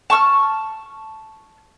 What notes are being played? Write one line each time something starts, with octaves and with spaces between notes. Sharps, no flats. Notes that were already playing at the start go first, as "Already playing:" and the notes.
A5 C#6 E6 F6